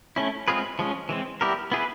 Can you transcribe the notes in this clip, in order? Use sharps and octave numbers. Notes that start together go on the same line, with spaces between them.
A3 C#4 E4
G#3 C4 F4 G#4 B4
F3 G#3 C#4
E3 G#3 C4
G3 B3 E4 G4 A#4
B3 E4 G#4 B4